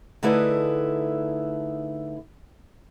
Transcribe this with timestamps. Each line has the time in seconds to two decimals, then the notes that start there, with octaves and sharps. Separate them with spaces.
0.23 D3 A3 D#4 E4 G#4 B4